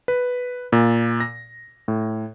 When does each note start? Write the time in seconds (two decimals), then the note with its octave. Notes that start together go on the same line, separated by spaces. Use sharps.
0.08 B4
0.72 A#2
1.20 A#6
1.88 A2